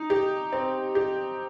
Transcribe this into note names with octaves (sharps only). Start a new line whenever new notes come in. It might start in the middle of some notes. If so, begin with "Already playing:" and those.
Already playing: D#4
G4
C4
G4